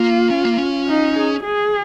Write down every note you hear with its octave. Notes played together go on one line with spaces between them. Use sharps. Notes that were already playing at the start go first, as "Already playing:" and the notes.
Already playing: A#3 F4
C#4
A#3
C#4
D#4
G#4
G#4